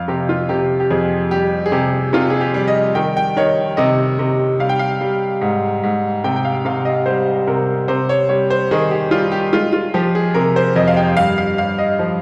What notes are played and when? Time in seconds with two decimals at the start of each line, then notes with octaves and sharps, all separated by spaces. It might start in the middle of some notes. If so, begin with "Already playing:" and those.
Already playing: F2 F5
0.08 C3 G4
0.29 F4
0.49 C3 G4
0.80 G4
0.90 F2 G#4
1.31 G3 G4
1.66 G#4
1.72 C3 G4
2.13 C3 F4
2.30 G#4
2.41 G4
2.54 G3
2.68 D#5
2.95 D#3 G5
3.17 G5
3.37 D#3 C#5
3.77 C3 D#5
4.19 C3
4.59 G3 F5
4.69 G5
4.79 F5
5.01 G3
5.41 G#2
5.83 G#2
6.24 C3 G5
6.36 G5
6.45 F5
6.65 C3 F5
6.85 D#5
7.06 G3 C5
7.47 C3 A#4
7.88 C3 C5
8.09 C#5
8.29 G3 C#5
8.50 C5
8.71 D#3 G#4
8.91 G4
9.11 G3 F4
9.32 G4
9.53 G#3 F4
9.73 F4
9.94 F3 G4
10.15 G#4
10.34 C3 A#4
10.56 C5
10.76 F2 D#5
10.88 F5
10.97 G5
11.17 G2 F5
11.38 F5
11.58 G2 F5
11.78 D#5
11.99 F3